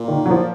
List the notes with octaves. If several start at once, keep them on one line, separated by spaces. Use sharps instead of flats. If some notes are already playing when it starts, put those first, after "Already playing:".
Already playing: A#2
D#3
F#3
F3